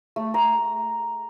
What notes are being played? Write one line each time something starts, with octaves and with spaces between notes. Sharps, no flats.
A3
A#5